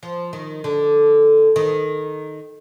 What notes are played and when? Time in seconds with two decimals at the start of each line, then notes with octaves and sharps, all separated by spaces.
0.03 F3
0.33 D#3
0.64 D3
1.56 D#3